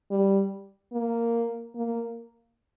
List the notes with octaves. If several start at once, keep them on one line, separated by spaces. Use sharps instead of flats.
G3
A#3
A#3